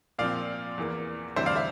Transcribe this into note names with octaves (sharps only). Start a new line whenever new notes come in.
A#2 F3 C4 D5 F5
E2 E3 A#3
D2 C3 E3 G3 C4 C5 E5
D5 F5
C5 E5